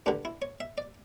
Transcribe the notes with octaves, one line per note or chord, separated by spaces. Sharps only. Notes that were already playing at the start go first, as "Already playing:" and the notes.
G2 D3 G3 D4
E4
C#5
E5
D5